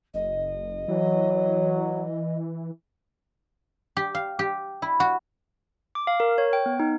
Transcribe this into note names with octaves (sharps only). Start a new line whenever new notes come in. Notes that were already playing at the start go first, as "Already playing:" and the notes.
F#1 D#5
E3 F#3
G4
F5
G4
E4
F#4
D6
F5
A#4
C#5
G5
B3
D#4